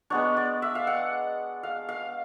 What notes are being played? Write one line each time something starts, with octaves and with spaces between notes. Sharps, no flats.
G#3 B3 D4 C#5
D5
E5
F5
F#5
F5
F5